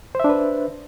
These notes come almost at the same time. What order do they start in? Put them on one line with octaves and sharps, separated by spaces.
C5 E5 D4 B4